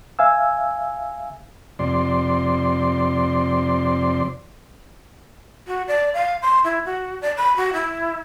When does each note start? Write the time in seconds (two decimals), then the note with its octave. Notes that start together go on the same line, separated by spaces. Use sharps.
0.19 E5 F5 G#5 E6
1.79 F2 C3 D5 C6
5.67 F#4
5.88 D5
6.14 F5
6.42 C6
6.64 E4
6.85 F#4
7.22 D5
7.38 B5
7.57 F#4
7.74 E4